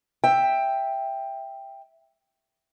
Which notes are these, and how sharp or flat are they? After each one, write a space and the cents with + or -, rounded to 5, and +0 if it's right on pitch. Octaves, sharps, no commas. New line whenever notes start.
E5 +0 G5 +10